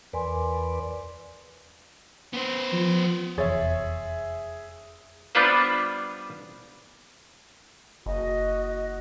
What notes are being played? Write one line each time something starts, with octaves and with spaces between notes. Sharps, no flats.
E2 A#4 B4 D5 G#5 C6
B3 C5
F3
F1 E2 G#4 C#5 E5 C6 A6
G3 B3 D4 F4 B4 C5
F#1 F#4 D#5